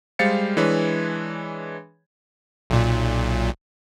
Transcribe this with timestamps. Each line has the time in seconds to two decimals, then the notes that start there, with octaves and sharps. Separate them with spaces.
0.19 G3 G#3 C5 F5 A6 C#7
0.57 E3 G#3 D4 B4 C#5
2.70 B1 A#2